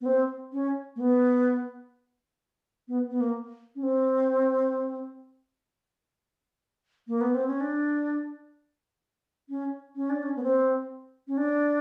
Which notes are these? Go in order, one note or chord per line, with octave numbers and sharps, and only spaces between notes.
B3
C4
C#4
A#3
B3
B3
B3
A#3
C#4
C4
A#3
B3
C4
C#4
D4
C#4
C#4
D4
C#4
B3
C4
C#4
D4